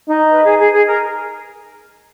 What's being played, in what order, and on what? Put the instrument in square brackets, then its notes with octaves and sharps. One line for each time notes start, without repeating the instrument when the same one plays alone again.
[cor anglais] D#4
[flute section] B4
G#4
G#4
G#4
A#4